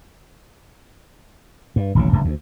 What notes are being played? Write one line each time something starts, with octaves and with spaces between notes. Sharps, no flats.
G2
D#1 A1 C#3
F#1 D2 G2
D2